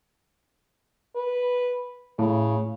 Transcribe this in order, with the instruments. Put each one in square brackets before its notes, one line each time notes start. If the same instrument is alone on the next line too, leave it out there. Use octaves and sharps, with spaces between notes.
[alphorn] B4
[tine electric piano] A2 [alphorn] C#3